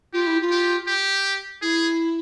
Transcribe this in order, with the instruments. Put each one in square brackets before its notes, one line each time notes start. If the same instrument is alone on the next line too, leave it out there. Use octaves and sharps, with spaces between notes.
[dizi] F4 [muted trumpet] G4
[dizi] E4
F4
[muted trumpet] G4
G4
[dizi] E4 [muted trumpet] G#4